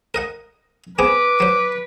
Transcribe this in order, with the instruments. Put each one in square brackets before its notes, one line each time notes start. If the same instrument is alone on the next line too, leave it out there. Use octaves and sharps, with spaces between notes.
[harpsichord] A#4 D#5 F#5
[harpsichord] B3 C4 G#4 [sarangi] B4 [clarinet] D6
[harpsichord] F#3 C5